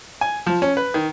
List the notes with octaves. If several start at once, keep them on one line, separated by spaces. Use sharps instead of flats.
G#5
F3
C#4
B4
D#3